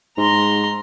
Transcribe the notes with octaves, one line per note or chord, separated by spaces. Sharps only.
G#2 A#5 C6